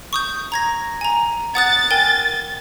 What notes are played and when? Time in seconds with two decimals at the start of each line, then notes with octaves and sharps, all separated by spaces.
0.13 C#6 D#6 G6
0.52 A#5 G#6 A#6
1.01 G#5 A#5
1.55 F#5 D#6 F#6 A6
1.91 A#4 G5 G#5